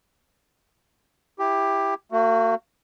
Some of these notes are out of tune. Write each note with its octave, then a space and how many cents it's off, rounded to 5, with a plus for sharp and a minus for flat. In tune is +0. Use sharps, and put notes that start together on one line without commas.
E4 +0 G4 +10
A#3 -45 F#4 +0